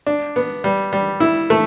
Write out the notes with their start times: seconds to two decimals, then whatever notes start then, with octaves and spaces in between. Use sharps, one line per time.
0.06 D4
0.36 B3
0.64 G3
0.93 G3
1.20 E4
1.50 A3